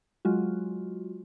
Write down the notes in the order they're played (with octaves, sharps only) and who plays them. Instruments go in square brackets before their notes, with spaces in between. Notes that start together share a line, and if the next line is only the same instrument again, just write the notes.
[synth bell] F#3 G#3 F4 F#4